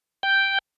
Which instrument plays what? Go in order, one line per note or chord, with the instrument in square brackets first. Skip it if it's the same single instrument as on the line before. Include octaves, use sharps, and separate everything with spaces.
[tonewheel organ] G5